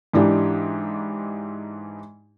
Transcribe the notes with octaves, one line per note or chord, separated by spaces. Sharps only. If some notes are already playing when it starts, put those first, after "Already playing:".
G#2 E3 D4 D#4 G4